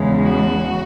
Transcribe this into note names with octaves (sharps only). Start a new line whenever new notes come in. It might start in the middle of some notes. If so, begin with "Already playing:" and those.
Already playing: E2 C#3 E3 G#3
F#4